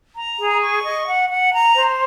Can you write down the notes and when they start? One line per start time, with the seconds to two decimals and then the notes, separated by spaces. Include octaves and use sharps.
0.16 A#5
0.38 G#4
0.61 C#6
0.84 D#5
1.07 F#5
1.30 F#5
1.52 A#5
1.75 C5